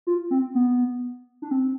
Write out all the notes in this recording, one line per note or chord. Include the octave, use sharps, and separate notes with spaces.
F4
C4
B3
D4
C4